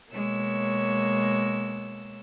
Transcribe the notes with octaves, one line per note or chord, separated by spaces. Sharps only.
B2 G#3 A#3 C#5 E6